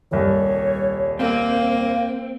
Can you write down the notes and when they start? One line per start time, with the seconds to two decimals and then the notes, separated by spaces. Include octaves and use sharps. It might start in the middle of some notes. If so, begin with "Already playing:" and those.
0.11 D#1 C2 C#5
1.19 A#3 C4 F5